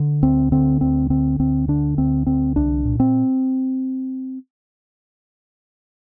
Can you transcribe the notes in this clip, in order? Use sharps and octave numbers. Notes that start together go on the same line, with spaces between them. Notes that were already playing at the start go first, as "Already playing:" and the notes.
Already playing: D3
D2 C4
D3 C4
D2 C4
D3 C4
D2 C4
D3 D4
D2 C4
D3 C4
C2 D4
A#2
C4